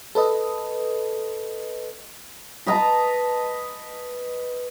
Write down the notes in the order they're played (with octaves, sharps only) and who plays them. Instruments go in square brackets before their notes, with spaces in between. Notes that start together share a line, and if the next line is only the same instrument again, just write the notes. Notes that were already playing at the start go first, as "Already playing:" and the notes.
[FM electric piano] A4 B4 D#5
[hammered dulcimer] B4 D#5 A5 A#5